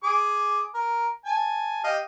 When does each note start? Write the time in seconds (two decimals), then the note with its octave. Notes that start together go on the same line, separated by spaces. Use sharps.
0.04 G#4 D6
0.74 A#4
1.26 G#5 A5
1.84 G4 D#5 F5